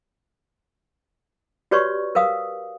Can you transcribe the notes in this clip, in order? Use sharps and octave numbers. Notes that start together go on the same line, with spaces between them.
F#4 G4 B4 C#5 D5 C#6
A#4 B4 F5 D#6